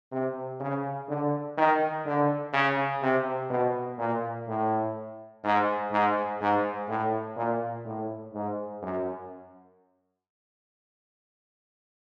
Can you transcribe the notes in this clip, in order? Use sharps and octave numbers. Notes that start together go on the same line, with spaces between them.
C3
C#3
D3
D#3
D3
C#3
C3
B2
A#2
A2
G#2
G#2
G#2
A2
A#2
A2
G#2
F#2